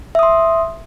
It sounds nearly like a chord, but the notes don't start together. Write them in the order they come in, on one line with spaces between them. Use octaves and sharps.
E5 D#6 C6